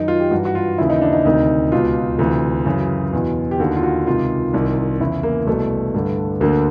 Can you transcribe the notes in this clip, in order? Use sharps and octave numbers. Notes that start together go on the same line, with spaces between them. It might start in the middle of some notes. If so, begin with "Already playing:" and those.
Already playing: F#2 D#3 D#4
F4
G4
G2 E3 F#4
F#4
F4
D#2 C#3 E3 E4
D#4
D4
D#4
D2 C3 D#3
C#2 B2 F4
D2 C3 E3
F#2 C#3 E3
E2 B2
G4
D#2 D3 F#4
F4
F#4
C#2 C3 D#3 F4
C2 C3 D#3
E2 C#3 E3 E4
A#3
C2 B2 A3
G2 D3
D2 D3 A#3